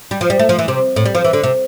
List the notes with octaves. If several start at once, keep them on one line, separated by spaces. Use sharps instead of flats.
G3
F3
G3
A3
F3
E3
C3
A2
G3
F3
E3
D3
C3